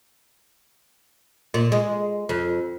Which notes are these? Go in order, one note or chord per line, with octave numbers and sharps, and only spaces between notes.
A#2
G#3
F2